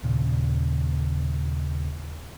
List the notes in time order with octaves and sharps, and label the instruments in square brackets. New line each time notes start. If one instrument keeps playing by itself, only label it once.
[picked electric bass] D#2 A#2 C#3